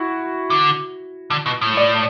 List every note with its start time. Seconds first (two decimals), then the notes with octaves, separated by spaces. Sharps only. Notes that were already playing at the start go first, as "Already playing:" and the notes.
Already playing: E4 F#4
0.50 D3
1.30 D3
1.46 B2
1.61 A2
1.77 D5